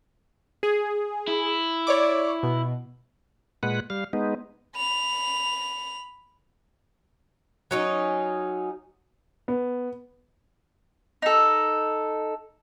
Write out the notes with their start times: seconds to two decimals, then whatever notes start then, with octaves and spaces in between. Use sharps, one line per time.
0.63 G#4
1.27 E4
1.87 C#5 D5 D6
2.43 B2
3.63 A#2 G#3 B4 F#5
3.90 G3 F5
4.13 G#3 B3 D#4
4.76 B5 F7
7.71 F#3 C#4 D#4
9.48 B3
11.22 D#4 A4